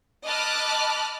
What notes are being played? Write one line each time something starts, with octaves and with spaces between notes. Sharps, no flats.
D#5 A5 B5 D6 F6 F#6